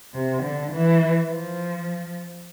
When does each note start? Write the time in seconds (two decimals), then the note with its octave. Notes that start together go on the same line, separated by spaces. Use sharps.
0.14 C3
0.43 D3
0.72 E3
1.29 F3